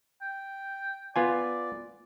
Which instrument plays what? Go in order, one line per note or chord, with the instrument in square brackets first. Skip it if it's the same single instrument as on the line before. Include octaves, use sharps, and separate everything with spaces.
[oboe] G5
[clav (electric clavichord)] B3 F4 G#5 [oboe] D5